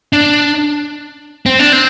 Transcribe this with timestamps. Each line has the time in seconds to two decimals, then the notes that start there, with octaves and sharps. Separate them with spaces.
0.13 D4
1.46 C4
1.59 D4
1.73 C4